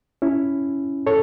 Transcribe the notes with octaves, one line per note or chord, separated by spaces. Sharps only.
C#4 E4
A4 C#5